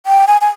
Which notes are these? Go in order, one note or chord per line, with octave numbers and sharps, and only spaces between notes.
G5
G#5
G#5